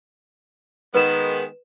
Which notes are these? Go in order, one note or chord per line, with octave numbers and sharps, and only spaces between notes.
D#3 G#3 B3 B4 E7